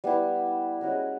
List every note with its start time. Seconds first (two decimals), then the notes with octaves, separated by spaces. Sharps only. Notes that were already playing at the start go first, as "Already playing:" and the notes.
0.04 G3 B3 E4
0.81 G#3 C#4 F#4 A#4